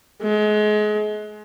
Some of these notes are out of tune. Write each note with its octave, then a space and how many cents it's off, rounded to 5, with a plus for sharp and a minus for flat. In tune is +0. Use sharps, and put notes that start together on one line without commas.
G#3 +30